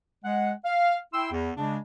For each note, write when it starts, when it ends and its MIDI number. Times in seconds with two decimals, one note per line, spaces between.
0.25 0.52 56
0.25 0.52 78
0.65 0.97 77
1.14 1.31 64
1.14 1.31 79
1.14 1.31 84
1.14 1.31 88
1.32 1.50 40
1.57 1.78 49
1.57 1.78 56
1.57 1.78 62